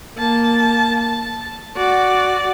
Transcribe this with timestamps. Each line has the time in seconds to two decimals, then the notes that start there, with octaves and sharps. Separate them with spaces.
0.18 A#3 A5
1.00 A5
1.77 F#4 D5